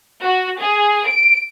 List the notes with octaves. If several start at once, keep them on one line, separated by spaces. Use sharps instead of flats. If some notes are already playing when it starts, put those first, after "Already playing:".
F#4
G#4
D7